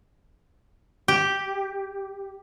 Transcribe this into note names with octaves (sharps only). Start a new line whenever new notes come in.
G4